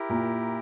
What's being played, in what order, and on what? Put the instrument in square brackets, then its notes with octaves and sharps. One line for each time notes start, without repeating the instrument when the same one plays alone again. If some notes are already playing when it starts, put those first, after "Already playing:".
Already playing: [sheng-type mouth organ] E4 G4 A#4
[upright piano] A#2